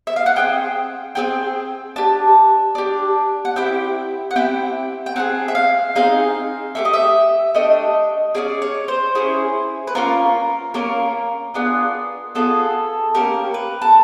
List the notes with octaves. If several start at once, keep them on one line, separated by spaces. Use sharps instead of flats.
E5
F5
F#5
C4 D#4 G#4 G5
C4 D#4 G#4 G5
D4 G4 A5
D4 G4
F#5
C4 E4 G4 G5
F#5
C4 E4 G4 G5
G5
C4 D#4 G#4 F#5
E5
F5
C4 D#4 G#4 F5
A3 D4 G4 E5
D#5
E5
A3 D4 G4 D#5
C#4 E4 G#4 D5
C#5
C5
C#4 E4 G#4
B4
A#3 C#4 F4 A#4
A#3 C#4 F4 A#4
B3 D4 F4 G#4
B3 D4 F4 G#4 A4
A#3 C#4 G4 A#4
B4
A4